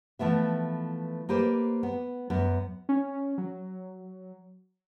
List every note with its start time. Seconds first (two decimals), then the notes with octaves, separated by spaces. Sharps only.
0.19 E3 F3 A3 B3 E5
1.29 A#3 G4 B4 C5 D5
1.83 B3
2.30 F#2 B3
2.89 C#4
3.38 F#3